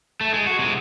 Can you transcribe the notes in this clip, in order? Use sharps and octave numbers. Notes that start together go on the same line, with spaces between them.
A3
G#3
F#4
C3 G#3